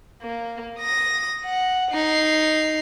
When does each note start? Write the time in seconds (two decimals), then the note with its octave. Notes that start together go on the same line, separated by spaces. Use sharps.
0.22 A#3
0.80 D#6 A#6
1.45 F#5
1.91 D#4 C7